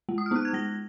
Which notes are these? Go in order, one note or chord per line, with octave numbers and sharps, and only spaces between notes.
G#3
D#6
F6
B3 D#4 F#6
G#6
G#3 A#6